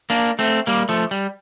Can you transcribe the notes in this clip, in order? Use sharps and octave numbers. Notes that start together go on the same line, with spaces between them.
A#3 D4
A3 C4
G3 A#3
F3 A3
G3